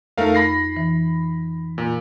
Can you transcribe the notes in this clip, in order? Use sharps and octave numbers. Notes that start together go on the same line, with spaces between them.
F2 A3 D#4 A#4 F5
B5 A#6 C7
E3
A#2